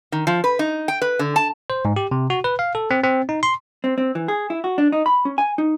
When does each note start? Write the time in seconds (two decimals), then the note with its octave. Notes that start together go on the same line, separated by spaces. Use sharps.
0.12 D#3
0.27 F3
0.44 B4
0.59 D#4
0.88 G5
1.02 B4
1.19 D3
1.36 A5
1.70 C5
1.85 G#2
1.96 G4
2.11 C3
2.30 F#4
2.44 B4
2.59 F5
2.75 A4
2.91 C4
3.04 C4
3.29 D#4
3.43 C6
3.84 C4
3.98 C4
4.15 E3
4.28 G#4
4.50 E4
4.64 F#4
4.78 D4
4.92 D#4
5.06 B5
5.25 C#4
5.38 G#5
5.58 D#4